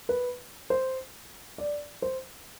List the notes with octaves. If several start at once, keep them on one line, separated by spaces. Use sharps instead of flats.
B4
C5
D5
C5